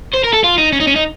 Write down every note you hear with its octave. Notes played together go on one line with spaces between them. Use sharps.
C5
A#4
A4
F4
D#4
C#4
D#4
C#4
D#4